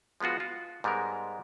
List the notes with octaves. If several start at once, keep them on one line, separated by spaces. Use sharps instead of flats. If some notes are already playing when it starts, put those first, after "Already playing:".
F3 G#3 B3 F4 F#4
F4
G#2 G3 G#3 B3 A#4